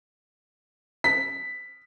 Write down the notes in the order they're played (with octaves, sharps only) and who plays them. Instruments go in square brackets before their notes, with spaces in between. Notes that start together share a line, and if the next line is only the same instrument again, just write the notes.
[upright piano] B6